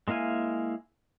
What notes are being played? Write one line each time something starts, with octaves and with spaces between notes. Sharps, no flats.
G#3 A#3 E4 F5 G#5